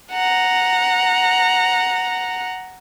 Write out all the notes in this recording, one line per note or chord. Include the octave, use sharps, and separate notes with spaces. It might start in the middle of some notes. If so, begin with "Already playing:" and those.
F#5 A#5